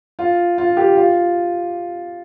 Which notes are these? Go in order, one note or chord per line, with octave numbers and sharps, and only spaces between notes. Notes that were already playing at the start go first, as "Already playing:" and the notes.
F4
F4
G4
F4